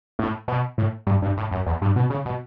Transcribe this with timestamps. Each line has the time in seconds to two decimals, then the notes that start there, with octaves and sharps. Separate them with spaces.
0.19 A2
0.48 B2
0.78 A2
1.07 G2
1.22 G2
1.37 A2
1.51 F#2
1.66 E2
1.82 G2
1.96 B2
2.10 C#3
2.26 B2